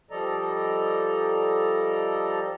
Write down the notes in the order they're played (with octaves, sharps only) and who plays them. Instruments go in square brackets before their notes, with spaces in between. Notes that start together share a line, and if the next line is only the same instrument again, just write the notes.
[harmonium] F3 G3 A4 D5 D#5 A#5